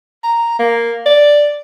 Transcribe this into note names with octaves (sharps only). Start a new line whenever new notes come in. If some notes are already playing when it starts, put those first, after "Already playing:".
A#5
A#3
D5